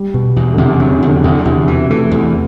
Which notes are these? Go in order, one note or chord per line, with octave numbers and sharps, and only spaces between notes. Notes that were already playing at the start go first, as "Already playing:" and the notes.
Already playing: G3
B2
E2
D3
E2 C3
C3
F#3
C3
E2 D3
E2 D3
E2 C3
B2 E3
E3 A3
E2 B3